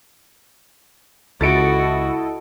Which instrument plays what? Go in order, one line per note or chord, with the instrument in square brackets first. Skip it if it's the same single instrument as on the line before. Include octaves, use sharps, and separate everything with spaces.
[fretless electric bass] C#2 [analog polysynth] E4 A4 D#5 [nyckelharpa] F#4 [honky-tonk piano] A6 C#7 D7